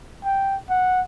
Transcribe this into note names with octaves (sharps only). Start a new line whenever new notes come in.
G5
F#5